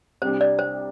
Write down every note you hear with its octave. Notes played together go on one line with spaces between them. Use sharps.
C2 C3 G3 D4 C5
D5
C5